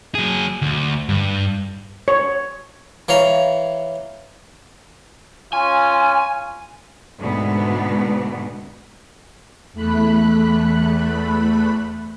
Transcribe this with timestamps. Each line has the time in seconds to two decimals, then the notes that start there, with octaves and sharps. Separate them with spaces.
0.15 F#3 G#4
0.62 D2
1.09 G2
2.08 C#5
3.08 E3 C#5 F5 A#5
5.53 C#4 F4 G#5
7.21 D2 G#2 B2 B3
9.73 E2 A3 B5 F#6